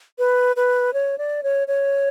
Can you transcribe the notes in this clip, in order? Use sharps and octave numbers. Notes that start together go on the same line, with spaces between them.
B4
B4
C#5
D5
C#5
C#5